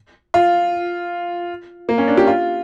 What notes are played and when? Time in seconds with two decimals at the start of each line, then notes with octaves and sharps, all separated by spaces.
0.34 F4
1.89 A#3
1.98 C#4
2.08 D4
2.17 G4
2.27 F4